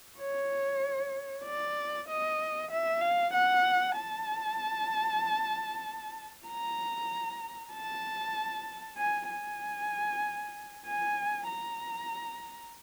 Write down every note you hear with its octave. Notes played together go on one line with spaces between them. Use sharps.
C#5
D5
D#5
E5
F5
F#5
A5
A#5
A5
G#5
G#5
G#5
A#5